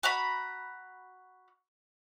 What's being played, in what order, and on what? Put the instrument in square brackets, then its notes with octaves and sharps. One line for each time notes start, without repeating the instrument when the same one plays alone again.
[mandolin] F#4 A#5 B5